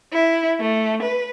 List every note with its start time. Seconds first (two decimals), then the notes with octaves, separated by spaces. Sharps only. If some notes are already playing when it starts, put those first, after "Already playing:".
0.12 E4
0.59 A3
1.02 B4